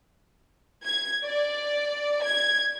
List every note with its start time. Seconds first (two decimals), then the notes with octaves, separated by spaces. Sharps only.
0.85 G#6
1.24 D5
2.24 G#6